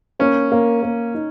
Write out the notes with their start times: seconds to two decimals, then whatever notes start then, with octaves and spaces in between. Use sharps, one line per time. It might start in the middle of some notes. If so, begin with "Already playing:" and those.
0.19 A#3 C#4
0.52 A#3
0.83 A#3
1.14 D#4